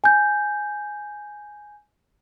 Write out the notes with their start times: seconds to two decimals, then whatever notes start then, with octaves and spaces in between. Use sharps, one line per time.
0.04 G#5 G6